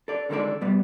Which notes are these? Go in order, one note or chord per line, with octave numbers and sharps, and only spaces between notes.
A4 D5
D3 D#3 G#3 C4 A4 D5
B2 G3 B3